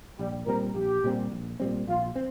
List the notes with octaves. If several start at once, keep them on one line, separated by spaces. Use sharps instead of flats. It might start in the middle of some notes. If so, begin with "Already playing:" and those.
A#1 G3
A#2 G3 C4 A#4
A#1 G4
A#2 G3 C4
A#1
A#2 G3 C4
A#1 F4
C4